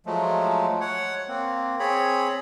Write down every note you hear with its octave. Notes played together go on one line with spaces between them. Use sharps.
F3 F#3 G#3 A3
C#5 F#5
A#3 C4
C4 G#4 C#5 B5